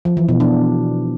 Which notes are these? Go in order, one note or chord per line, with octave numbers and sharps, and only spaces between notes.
F3
E3
B2
D4